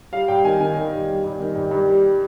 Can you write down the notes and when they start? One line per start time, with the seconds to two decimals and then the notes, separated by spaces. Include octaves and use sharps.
0.13 G3 F5
0.28 G2 G5
0.44 D#3 G#5
0.60 D#3 G#5
0.76 D#3
0.93 G2
1.09 G3
1.24 G2
1.39 D#3
1.56 G2
1.71 G2
1.88 G3